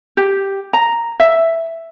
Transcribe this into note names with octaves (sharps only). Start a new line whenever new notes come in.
G4
A#5
E5